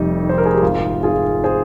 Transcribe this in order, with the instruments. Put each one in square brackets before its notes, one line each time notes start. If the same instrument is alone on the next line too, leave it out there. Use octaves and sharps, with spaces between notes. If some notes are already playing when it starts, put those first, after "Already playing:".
Already playing: [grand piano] F1 F2 G3 D#4
D#3
C5
A#4
G#4
G4
G#1 F4
G#2 F4 G#4
G#4 C5